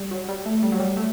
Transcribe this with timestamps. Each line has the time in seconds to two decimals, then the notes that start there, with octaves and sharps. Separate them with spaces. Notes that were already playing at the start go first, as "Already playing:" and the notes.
Already playing: G3
0.11 F#3
0.28 G3
0.45 A3
0.63 G3
0.72 F#3
0.80 G3
0.97 A3